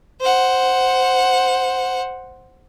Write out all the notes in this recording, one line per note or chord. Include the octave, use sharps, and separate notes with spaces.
C5 F#5